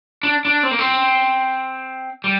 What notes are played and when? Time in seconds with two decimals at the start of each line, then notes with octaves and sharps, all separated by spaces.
0.23 D4
0.45 D4
0.63 C4
0.71 A#3
0.79 C4
2.24 G3